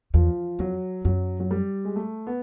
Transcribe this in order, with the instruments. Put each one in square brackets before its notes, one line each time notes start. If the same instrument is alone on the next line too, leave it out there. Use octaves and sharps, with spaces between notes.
[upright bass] E2 [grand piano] F3
[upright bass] F2 [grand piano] F#3
[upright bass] F#2 [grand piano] F#3
[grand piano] F#3
G3
G#3
A3
B3